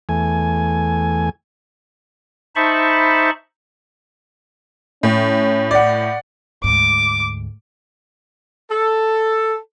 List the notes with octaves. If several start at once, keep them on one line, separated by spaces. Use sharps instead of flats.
E2 A3 G#5
D#4 C5 E5 A5 B5 C#6
A2 C#4
D5 F#5
D2 G#2 D6
A4